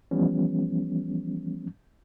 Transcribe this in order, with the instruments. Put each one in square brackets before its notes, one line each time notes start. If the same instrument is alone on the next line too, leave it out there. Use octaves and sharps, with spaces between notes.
[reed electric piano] E3 F3 G3 B3 C#4